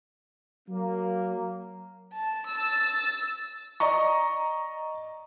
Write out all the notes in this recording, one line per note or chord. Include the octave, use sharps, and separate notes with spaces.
F#3 A#3
A5
E6 A6
D5 D#5 A#5 C#6